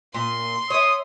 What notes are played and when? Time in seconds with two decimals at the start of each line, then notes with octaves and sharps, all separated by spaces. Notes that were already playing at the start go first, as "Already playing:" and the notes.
0.14 A#2 C6
0.70 C#5 E5 D#6